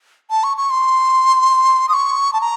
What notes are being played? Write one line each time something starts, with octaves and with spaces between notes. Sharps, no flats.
A5
C#6
C#6
C6
D#6
C#6
A5
A#5